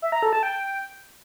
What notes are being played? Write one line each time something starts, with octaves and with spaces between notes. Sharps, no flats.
E5
A#5
A4
A5
G5